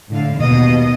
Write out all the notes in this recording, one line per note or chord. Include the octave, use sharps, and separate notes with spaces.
A2 D3 F5
D#2 B2 D#5